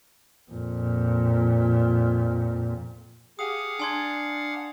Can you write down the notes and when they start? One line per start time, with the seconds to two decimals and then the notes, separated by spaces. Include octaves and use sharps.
0.51 F2 A#2
3.39 G4 G#4 F5 F#5 D#6
3.79 D4 G#5 C6 G#6